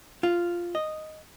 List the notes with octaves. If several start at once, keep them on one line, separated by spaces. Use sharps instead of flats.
F4
D#5